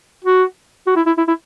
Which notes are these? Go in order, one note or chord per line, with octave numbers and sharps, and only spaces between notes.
F#4
F#4
E4
E4
E4
E4